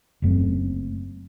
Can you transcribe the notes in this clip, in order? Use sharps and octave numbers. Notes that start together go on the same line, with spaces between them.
F#1 F#2 A3 C4